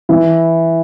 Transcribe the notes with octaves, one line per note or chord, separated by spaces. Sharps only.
E3 E4